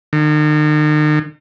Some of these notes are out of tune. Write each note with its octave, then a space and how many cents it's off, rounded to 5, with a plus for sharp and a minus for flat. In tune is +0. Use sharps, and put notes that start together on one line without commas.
D#3 -40